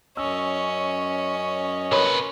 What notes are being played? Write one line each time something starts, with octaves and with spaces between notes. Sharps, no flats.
F#2 C#4 D#5 C#6 E6
C3 A#4 B4 C#5 C6